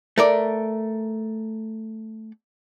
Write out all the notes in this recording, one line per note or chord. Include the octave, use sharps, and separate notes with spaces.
A3 A#4 D5